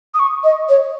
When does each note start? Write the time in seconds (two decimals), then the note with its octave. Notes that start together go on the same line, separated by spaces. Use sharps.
0.14 D#6
0.19 C#6
0.44 D#5
0.69 C#5